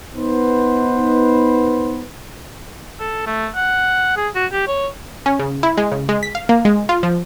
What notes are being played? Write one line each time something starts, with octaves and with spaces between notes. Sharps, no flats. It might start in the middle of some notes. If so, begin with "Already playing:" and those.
B3 D#4 B4 C5
A4
A3
F#5
G#4
F#4
G4
C#5
C#4
C#3
E4
G#3
C#3
G#3
B6
F5
A#3
G#3
F4
F3